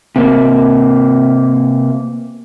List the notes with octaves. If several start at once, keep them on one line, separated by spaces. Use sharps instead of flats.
C3 A#3